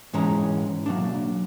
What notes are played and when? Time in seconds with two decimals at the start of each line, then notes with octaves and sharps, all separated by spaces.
0.13 G#2 E3 G#3 C#4 A#5
0.86 F#3 A#3 D4